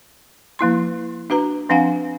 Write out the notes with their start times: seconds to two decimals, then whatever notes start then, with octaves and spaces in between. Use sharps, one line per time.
0.59 F3 A#3 E4 C6
1.30 D4 F#4 B4 A#5
1.69 F3 C4 D4 F5 F#5 G#5